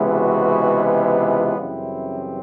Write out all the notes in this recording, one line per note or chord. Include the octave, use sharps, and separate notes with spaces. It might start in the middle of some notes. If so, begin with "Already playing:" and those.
Already playing: C#2 C3 E3 G#3 B3
F#4
F4
F#2 C#3 E3 G3 C4 E4